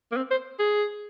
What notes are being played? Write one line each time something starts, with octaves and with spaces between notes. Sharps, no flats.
A#3
C4
C5
G#4